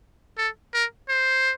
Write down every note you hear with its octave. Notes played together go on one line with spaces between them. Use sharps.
A4
A#4
C5